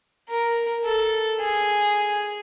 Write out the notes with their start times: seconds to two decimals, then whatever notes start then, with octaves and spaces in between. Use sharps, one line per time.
0.30 A#4
0.85 A4
1.41 G#4